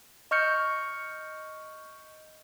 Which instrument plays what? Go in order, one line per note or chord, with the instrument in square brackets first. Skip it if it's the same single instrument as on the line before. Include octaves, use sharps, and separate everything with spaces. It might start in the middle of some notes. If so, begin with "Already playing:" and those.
[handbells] D#5 C#6 F6 G6 C#7